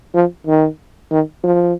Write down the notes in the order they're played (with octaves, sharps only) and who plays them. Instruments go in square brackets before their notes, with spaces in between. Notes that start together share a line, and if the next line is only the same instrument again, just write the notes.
[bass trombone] F3
D#3
D#3
F3